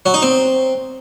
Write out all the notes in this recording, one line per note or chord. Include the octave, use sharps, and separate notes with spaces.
F#3
D#4
C4